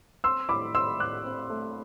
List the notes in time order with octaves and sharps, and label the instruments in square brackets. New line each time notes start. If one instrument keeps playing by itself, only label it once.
[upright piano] C4 C6 E6
A2 B5 D6
C4 C6 E6
A2 D6 F#6
C4
A3